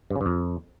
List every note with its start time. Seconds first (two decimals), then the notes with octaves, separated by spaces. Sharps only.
0.10 G2
0.16 C#3
0.21 G2
0.26 F2